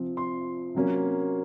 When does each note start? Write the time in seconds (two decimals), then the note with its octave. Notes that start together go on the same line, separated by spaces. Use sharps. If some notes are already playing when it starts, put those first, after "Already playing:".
Already playing: C3 F3 C4
0.17 C6
0.74 C3 F#3 A#3 C#4